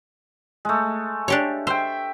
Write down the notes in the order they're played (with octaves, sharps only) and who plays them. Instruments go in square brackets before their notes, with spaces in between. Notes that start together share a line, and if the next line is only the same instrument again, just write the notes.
[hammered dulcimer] G#3 A3
[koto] D4 G4 C#5
[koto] C5 [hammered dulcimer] E5 G5